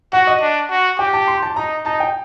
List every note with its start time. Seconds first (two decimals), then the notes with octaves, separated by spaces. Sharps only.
0.13 F#4 F#5
0.27 D#5
0.41 D4
0.70 F#4
0.99 G4 G5
1.13 A5
1.28 C6
1.42 A5
1.56 D#4 A#5
1.85 D#4 A5
2.00 G5